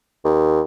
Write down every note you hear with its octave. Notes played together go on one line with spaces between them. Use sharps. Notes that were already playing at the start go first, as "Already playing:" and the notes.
D#2